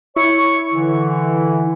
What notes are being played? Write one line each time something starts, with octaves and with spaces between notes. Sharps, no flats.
E4 C#5 C#6
D3 E3